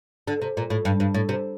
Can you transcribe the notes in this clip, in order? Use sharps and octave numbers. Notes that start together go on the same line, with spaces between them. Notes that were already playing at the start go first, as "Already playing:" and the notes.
D3
C3
A#2
A2
G2
G2
A2
C3